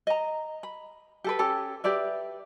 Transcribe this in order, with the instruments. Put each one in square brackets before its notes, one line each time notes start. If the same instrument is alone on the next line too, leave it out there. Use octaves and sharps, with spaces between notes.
[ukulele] D#5 A#5
B5
G4 A4 B4
C#4 G4 A4 A5
G4 B4 D5 E5